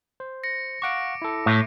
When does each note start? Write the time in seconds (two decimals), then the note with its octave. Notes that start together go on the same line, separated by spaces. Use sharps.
0.20 C5
0.44 A#6 C#7
0.82 F5 F#5 C#6 D6 D7
1.22 E4 A4
1.46 A2